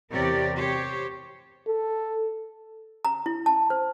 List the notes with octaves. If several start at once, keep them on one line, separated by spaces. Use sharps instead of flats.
E2 C3 G4 A#4 C#5 D5
G4 C5 C#5
A4
A#5
E4
A5
C5